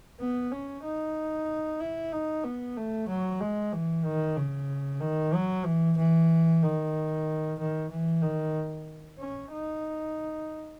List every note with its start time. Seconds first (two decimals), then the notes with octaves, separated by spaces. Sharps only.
0.20 B3
0.52 C#4
0.84 D#4
1.81 E4
2.12 D#4
2.44 B3
2.77 A3
3.09 F#3
3.41 G#3
3.73 E3
4.05 D#3
4.37 C#3
5.01 D#3
5.34 F#3
5.65 E3
5.97 E3
6.63 D#3
7.59 D#3
7.90 E3
8.22 D#3
9.19 C#4
9.52 D#4